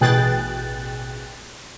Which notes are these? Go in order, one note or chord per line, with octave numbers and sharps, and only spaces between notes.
A1 B2 G#4 G5 F#6 A6